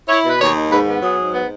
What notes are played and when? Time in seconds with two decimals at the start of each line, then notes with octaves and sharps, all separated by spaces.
0.08 E4 C#5
0.25 B2 B4
0.40 D#2 C#5
0.56 D#3
0.70 G#2 B4
0.87 B3
1.02 F#3 G#4
1.17 G#2
1.34 B3